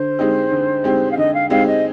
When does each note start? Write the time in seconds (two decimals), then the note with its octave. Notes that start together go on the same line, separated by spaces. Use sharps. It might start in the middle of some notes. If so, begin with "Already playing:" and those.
Already playing: D3 C5
0.19 G#3 C4 D#4 G4
0.52 D3
0.84 G#3 C4 D#4 G4
1.11 F5
1.17 D3 D#5
1.34 F5
1.50 G#3 C4 D#4 G4 F5
1.66 D#5